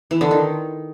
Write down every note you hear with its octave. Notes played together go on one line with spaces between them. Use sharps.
E3
D3
D#3